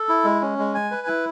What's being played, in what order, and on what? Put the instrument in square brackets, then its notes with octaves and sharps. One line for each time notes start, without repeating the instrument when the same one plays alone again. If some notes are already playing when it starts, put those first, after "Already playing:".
Already playing: [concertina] A4
E4
G#3
C#4
G#3
G#5
B4
E4